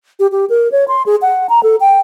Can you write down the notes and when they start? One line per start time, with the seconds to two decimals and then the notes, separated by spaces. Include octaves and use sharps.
0.20 G4
0.32 G4
0.50 A#4
0.72 C#5
0.88 C6
1.06 G#4
1.22 F#5
1.49 A#5
1.63 A4
1.80 G5